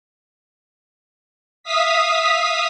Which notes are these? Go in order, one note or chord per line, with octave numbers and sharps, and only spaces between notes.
E5 F5 D#6 B6